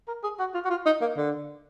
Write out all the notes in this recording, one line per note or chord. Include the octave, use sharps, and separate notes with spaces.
A#4
G#4
F#4
F4
F#4
F4
D#4
A#3
D3